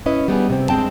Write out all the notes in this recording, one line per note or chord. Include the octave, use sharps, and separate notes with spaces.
G#2 C#4 E4 B4 D#5
G3 B3 D4 G#4
C3 C4
G2 G#3 C4 G5 A5